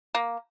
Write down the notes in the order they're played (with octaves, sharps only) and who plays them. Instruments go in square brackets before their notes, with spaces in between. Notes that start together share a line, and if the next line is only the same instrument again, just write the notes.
[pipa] A#3